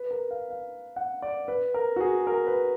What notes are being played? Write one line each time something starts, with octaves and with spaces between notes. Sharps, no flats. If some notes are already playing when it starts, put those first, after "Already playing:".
Already playing: B4
A#4
F5
F5
F#5
D5
B4
A#4
F#4
G#4
A#4
B4